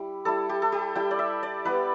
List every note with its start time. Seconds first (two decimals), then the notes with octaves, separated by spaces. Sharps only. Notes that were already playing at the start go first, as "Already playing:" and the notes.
Already playing: G3 E4
0.25 G3 E4 A4
0.49 G4
0.62 A4
0.72 G4
0.96 G3 E4 G5
1.11 D5
1.19 E5
1.43 D5
1.65 G3 B3 E4 B4